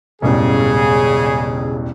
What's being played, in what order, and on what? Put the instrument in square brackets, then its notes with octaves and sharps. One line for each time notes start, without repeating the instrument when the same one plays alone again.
[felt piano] E1 A1 G2 [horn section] C#3 G#4